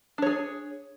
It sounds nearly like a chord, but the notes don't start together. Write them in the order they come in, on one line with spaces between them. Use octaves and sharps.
D4 C#5 G#4